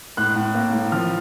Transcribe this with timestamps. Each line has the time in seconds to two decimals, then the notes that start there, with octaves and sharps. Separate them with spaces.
0.17 A2 F#6
0.36 A2
0.55 A#3
0.73 A2
0.92 F3 F6